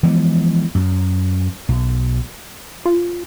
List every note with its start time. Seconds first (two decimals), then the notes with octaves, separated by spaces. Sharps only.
0.03 E3 F3 G#3 B3
0.75 F#2
1.69 B1
2.86 F4